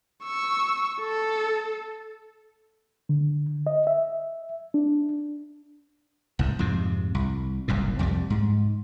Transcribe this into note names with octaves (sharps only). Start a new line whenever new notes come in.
C#6 E6
A4
D3
D#5
E5
D4
C2 G#2
F2 G#2 C3
C2
F#1 C2 F#2 A2
C2 F2 F#3 G3
G#2